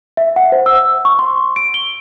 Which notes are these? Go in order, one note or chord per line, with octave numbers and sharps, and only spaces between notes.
E5
F#5
C5
E6
C#6
C6
D7
G7